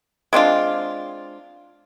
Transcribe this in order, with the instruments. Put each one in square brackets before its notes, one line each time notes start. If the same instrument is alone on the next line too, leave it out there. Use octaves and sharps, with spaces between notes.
[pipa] G#3 C4 D4 F4